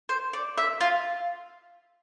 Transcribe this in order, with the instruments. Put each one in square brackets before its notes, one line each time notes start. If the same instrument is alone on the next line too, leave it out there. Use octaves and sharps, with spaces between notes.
[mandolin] C5
D5
E5
F4